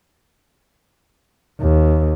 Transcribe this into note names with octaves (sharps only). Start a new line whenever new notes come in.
D#2